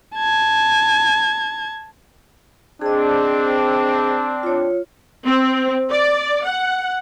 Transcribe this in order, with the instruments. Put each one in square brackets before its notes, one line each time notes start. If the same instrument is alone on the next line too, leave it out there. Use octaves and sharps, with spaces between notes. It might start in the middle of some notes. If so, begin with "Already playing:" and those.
[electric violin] A5 G#6
[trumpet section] C4 D4 [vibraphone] G#4 D#5
[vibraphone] F4 C#5
[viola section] C4
D5
F#5